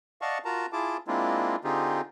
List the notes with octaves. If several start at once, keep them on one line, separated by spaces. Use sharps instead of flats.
D5 D#5 F5 F#5 A5 C#6
F4 F#4 A#4 A5 A#5
E4 F4 G#4 A5 D6
G#3 A#3 C4 D4 E4 F4
D3 C4 D#4 F4 G4 G#4